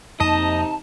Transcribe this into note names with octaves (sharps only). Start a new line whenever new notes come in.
F2 C3 A#3 D#4 D#5 A5